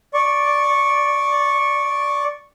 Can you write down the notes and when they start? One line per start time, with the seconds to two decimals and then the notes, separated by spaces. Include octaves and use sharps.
0.14 D5 C#6